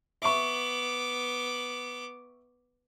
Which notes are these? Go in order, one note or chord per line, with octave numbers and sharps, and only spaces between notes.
B3 E5 C#6 D6